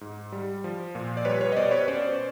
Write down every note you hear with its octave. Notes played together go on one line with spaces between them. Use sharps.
G#2
G3
F3
A#2
D5
G3 B4 C#5
B4 C#5
D#5
B2 C5 D5
B4 C#5
C#4 C5 D5